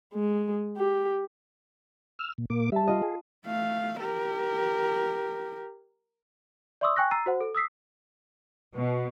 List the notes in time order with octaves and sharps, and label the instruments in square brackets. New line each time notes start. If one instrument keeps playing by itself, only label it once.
[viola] G#3
G4
[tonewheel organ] E6 F6
A#2
A#2 A#3 D6
[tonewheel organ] G3 [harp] E5 A5
[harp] F4 D#5
[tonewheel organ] G#4
[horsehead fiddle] A3 F5
G4 A#4
[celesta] D5 E5 C6 C#6 D#6 E6
G5 G#5 C#6 F#6 A#6
A#5 E6 A6 C7 D#7
F#4 C5 F#5
A4
D#6 E6 B6 C7
[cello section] B2